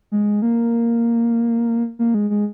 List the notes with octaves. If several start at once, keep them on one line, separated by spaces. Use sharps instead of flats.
G#3
A#3
A#3
G#3
G#3